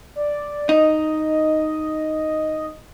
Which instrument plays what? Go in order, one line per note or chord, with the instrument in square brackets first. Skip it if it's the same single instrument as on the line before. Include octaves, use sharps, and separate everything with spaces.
[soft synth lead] D5
[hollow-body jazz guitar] D#4 [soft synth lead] D#5